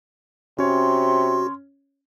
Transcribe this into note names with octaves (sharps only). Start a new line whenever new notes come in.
C3 C#4 F#4 C#5 C6